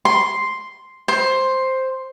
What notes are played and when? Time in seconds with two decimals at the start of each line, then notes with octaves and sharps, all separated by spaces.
0.05 C6
1.08 C5